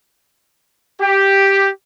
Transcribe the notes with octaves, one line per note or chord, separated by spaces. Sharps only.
G4